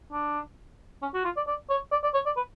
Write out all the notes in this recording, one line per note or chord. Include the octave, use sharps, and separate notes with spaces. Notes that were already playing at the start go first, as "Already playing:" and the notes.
D4
C#4
F#4
F4
D5
D5
C#5
D5
D5
C#5
D5
B4